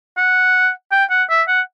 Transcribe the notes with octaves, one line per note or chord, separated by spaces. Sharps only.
F#5
G5
F#5
E5
F#5